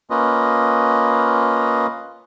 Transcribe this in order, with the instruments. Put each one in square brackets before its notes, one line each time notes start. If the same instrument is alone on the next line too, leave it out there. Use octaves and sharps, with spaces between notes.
[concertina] A#3 C#4 F4 B4 D#5